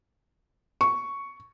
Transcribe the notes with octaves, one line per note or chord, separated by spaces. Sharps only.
C#6